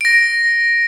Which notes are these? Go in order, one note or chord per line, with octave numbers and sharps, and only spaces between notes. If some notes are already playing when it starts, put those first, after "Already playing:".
A#6 D7